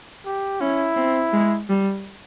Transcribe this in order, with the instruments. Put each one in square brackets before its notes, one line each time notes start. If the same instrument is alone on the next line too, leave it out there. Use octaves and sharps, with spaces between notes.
[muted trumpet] G4
[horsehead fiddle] C#4 [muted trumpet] E4
[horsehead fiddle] C4
G#3
G3